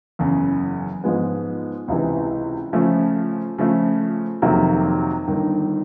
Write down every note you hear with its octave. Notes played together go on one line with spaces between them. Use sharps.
F#1 E2 C#3
G#2 F3 G#3 B3
C#2 C3 E3
C#3 F3 A3
C#3 F3 A3
F2 C3 D#3 F#3 A#3
G1 G2 D#3